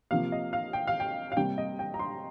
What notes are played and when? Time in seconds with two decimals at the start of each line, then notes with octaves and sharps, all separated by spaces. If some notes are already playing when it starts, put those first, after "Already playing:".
0.11 C3 F3 A#3 F5
0.32 D#5
0.53 F5
0.73 G5
0.87 F5
1.00 G5
1.32 F5
1.37 C3 G3 A#3 G5
1.58 D#5
1.79 G5
1.94 A#5
1.99 C6